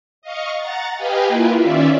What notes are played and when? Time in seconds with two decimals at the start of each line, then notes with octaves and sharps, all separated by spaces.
0.22 D#5 F5 C#6
0.58 F#5 A#5 A6
0.97 G4 B4 D#5 F5 G5 G#5
1.28 A#3 E4 F4 A#4 B4
1.60 D#3 C#4 F4 D5 E5